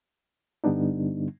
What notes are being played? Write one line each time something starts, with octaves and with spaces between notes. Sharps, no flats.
G2 D3 G3 B3 D4 D#4